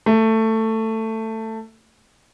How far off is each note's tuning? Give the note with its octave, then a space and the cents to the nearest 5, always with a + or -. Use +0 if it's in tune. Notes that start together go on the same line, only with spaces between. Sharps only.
A3 +15